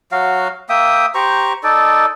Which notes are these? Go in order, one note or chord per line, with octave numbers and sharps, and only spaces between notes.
F#3 F#4 F5
A#3 E5 G5 D#6
G4 C5 A#5 C#6
D#4 A4 D5